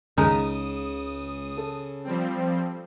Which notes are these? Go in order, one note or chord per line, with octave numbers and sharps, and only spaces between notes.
C#2 C#3 G#3 D#4 A#4 D#6
A4
F3 G3 C4